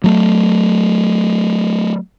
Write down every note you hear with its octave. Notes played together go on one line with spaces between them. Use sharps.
F#3 A3